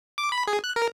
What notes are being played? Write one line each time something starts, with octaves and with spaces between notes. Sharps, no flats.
D6
B5
G#4
F#6
A#4